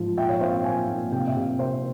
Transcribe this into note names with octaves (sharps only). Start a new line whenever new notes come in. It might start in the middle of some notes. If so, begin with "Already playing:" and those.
Already playing: G#2 F3
A#2 E5 G5
C#5 F5
C4 C5 E5
G5
A#2 F5 G#5
A#2
C3 G5
F5
E5 G5
C3
C3 C5 E5